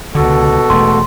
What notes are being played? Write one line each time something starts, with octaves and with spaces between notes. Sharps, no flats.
C#2 B2 D3 F#4 A4
E1 A3 C6